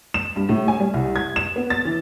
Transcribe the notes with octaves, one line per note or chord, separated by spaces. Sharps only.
E7
G2
A2
G#5
G3
C2
G#6
E7
B3
A6
E3